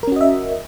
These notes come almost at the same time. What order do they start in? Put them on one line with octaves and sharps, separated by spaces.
A#4 C#4 F#4 D#5 E5